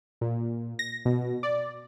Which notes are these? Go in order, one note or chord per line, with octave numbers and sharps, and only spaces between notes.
A#2
A#6
B2
D5